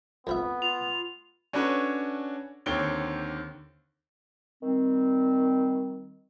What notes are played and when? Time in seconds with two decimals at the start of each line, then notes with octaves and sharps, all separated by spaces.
0.27 F2 F3 B3 E5
0.62 F4 F7
1.53 C#4 D4 F#4 A4 B4 C#5
2.66 D#2 D3 C4 C#5 D7 G7
4.63 D#3 G3 C4